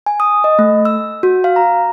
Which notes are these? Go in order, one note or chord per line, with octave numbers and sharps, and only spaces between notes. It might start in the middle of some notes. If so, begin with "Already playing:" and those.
G#5
D#6
D#5
A3
E6
F#4
F5
A#5